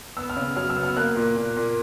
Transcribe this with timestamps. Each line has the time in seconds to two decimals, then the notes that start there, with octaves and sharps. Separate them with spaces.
0.17 B3 E6
0.30 F6
0.37 C#3
0.56 F#3 F6
0.70 E6
0.77 B3
0.83 F6
0.97 A#3 F#6
1.16 A#2
1.36 A#2
1.56 A#2